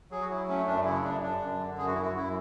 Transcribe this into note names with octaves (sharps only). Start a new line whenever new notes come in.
F#3 G#4
F#4
F#3 E4
A3 C#4
F#2 D4
C#3 E4
F#2 D4
F#2 D4
F#2
D3
F#2 G#4
F#4
E4
F#2 F#4
F#2 E4